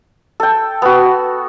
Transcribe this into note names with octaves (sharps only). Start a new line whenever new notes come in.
A4 G5
B3 F#4